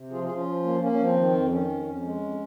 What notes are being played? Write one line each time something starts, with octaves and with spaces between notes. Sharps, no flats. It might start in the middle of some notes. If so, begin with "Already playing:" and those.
Already playing: C3
F3 F4 G#4
F4 G#4
F3
C#4 F4
F3
A#3
A#3 C#4
C#4
F3 C4
D#3
F2
D#3 C#4
F2
F2 C#4
G#3
F2